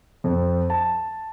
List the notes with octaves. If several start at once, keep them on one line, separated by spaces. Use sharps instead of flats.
F2
A5